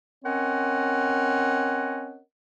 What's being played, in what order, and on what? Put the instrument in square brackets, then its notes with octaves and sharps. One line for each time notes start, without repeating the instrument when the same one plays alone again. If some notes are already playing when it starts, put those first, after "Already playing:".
[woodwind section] C4 C#4 A#4 C#5 D#5 F#5